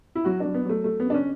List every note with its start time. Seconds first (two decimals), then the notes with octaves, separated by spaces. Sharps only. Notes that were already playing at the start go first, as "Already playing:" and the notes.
0.15 E4
0.25 F#3 F#4
0.40 D4
0.45 F#3
0.54 B3
0.65 F#3 A3
0.84 F#3 A3
1.00 B3
1.05 C#3 D4
1.14 C#4